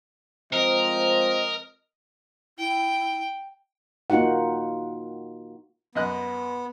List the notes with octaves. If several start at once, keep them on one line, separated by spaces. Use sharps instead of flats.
F3 G#3 C4 A#4 C5 D#5
E4 G5
A#3 D#4 F4 F#4 F#5
F#2 B3 D#5 F#6